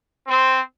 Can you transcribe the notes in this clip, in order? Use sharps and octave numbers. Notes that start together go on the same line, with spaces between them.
C4